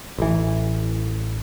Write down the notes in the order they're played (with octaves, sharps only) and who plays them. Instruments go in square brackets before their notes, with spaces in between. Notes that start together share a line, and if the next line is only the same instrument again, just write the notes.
[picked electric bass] A1 E3